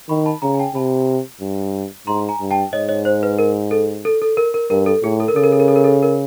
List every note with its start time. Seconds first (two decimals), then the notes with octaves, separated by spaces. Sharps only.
0.09 D#3 B5 C#6
0.26 A5 B5
0.42 C#3 G#5 A#5
0.54 G#5
0.59 G5 A5
0.75 C3 A5 B5
1.41 G2
2.07 G#2 A#5 C6
2.29 G#5 A#5
2.41 G2
2.51 G5 A5
2.73 G#2 C#5 D#5
2.89 C#5 D#5
3.05 C5
3.23 B4
3.39 A#4
3.71 A4
4.05 A4
4.22 A4
4.37 A#4
4.54 A#4
4.70 G2 A#4
4.86 A4
5.03 A2 G#4
5.20 A4
5.28 A#4
5.36 C#3 A4
5.44 A#4
5.52 A4
5.60 A#4
5.68 A4
5.76 A#4
5.84 A4
6.03 A#4